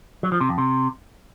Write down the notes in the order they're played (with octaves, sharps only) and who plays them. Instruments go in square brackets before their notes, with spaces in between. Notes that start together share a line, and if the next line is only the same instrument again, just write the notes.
[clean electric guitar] F#3
F3
C3
F2
C3